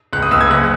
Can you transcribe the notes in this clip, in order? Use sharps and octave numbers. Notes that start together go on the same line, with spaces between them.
C#2 F#6
D#6
C#2 E6
G#6
F#1 F#6